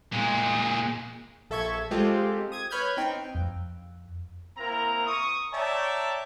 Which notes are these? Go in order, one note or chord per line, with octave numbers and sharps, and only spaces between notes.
A#2 G#3
A#1 A4 E5 C#6 G#6
G#3 C4 F4 G4 A4
D#6 G#6
B4 C#5 B5 F6 G6 G#6
C4 D#4 G5
F2
A#3 C4 E4 A#4 A#5
C#6 D#6
C#5 D5 E5 G5 A5 A#5